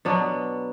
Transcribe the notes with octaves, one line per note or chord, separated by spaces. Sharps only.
B2 F#3 B3 D4